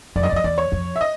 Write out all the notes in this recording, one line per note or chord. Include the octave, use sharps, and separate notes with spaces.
F2 D5
F#2 D#5
D5
F2
D#5
E2 D5
C#5
F2
E5
D#5